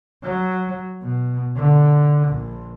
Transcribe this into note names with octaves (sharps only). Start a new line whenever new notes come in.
F#3
B2
D3
A#1